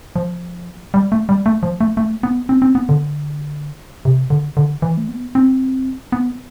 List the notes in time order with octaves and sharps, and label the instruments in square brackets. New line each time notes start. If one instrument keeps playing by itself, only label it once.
[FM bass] F3
G3
A3
G3
A3
F3
A3
A3
B3
C4
C4
B3
D3
C3
D3
D3
E3
A3
B3
C4
B3